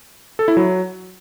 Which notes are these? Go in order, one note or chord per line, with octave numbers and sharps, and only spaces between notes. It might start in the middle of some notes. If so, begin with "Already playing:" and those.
A4
E4
F#3